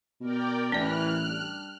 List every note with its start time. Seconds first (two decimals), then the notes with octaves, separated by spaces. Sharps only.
0.20 B2 A#4 D5 G5
0.72 A1 E3 C#4 D5 F6 F#6
1.26 G3 D4